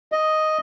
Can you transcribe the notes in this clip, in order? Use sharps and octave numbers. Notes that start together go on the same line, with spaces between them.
D#5